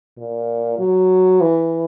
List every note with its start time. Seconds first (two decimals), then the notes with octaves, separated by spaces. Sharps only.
0.18 A#2
0.79 F#3
1.41 E3